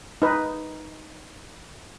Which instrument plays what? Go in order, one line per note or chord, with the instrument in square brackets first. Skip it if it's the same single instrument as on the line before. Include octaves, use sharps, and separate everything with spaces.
[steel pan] D#4 B4